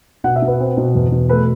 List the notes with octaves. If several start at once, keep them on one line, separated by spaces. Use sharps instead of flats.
B2 F#5
E5
B2
B4
C4
B2
E2
B2
A3 B4